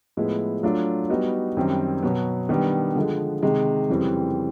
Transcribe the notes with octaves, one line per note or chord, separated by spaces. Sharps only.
A2 F3 G#3 B3 E4
F#3 A3 D4 F4
G3 B3 D#4 F#4
F#2 D#3 G3 C4
B2 F#3 B3
D#3 G3 B3 D4
D3 F3 G#3
C3 D#3 G#3
F2 C#3 E3 G3 C4